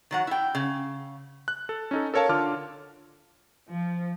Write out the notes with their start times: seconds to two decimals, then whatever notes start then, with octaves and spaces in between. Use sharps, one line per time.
0.11 D#3 F#3 F#5
0.27 E4 G5
0.55 C#3
1.48 F#6
1.69 A4
1.91 C#4 D#4 A4
2.14 A4 A#4 C#5 F5 A5
2.29 D3 F4 A5 D6 F6
3.70 F3